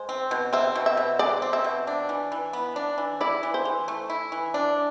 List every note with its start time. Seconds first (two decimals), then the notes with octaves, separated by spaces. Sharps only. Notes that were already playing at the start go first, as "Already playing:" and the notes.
Already playing: G#3 C5
0.09 C4
0.31 B2
0.53 C4 E5
0.75 B2
0.86 E5
0.97 B2
1.19 G#3 D5
1.42 C4
1.53 E5
1.64 B2
1.87 D4
2.09 E3
2.32 E3
2.53 B3
2.76 D4
2.98 E3
3.21 E4 D5
3.43 E3
3.54 C5
3.65 E3
3.88 A3
4.10 E4
4.32 E3
4.54 D4